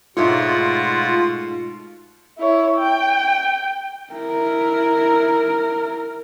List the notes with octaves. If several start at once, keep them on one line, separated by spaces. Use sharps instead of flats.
G#2 B2 A3 F4 C#5 F#5
E4 C#5
G5
E4 A#4